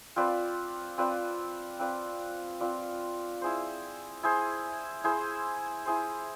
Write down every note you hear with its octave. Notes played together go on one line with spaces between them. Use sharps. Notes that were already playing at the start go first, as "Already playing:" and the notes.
C4 F4 B4 D5
C4 F4 B4 D5
C4 F4 B4 D5
C4 F4 B4 D5
E4 G#4 C5
E4 G#4 C5
E4 G#4 C5
E4 G#4 C5